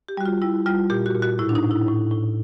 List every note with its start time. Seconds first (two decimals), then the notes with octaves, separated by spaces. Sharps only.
0.09 G4
0.17 G3 F#4
0.26 F4
0.42 G3 E4
0.66 G3 F4
0.90 A#2 G4
1.06 F#4
1.15 A#2
1.22 F#4
1.39 A2 E4
1.49 D4
1.55 D#4
1.62 A2
1.71 E4
1.88 A2
2.11 A2